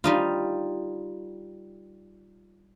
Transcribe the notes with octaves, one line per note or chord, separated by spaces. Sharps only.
G3 D#4 F4